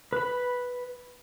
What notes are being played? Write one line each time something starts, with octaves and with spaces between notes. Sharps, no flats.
B4 B5